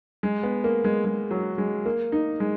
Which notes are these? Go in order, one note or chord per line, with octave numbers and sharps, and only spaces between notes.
G#3
B3
A#3
G#3
G#3
F#3
G#3
A#3
D#4
G#3